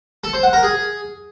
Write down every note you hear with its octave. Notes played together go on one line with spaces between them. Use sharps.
A4
C5
F#5
A#4
G#4